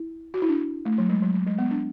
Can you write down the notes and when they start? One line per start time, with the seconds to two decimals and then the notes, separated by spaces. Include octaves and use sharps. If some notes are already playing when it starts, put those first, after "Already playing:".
Already playing: E4
0.34 F#4
0.42 E4
0.49 D4
0.85 A3
0.98 F#3
1.09 G#3
1.22 F#3
1.34 F#3
1.47 G#3
1.59 B3
1.71 D4